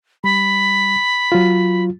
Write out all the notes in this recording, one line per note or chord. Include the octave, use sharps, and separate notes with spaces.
G3 B5
F#3 F4